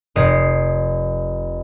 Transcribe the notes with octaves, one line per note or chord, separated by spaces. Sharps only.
F1 D#5 C7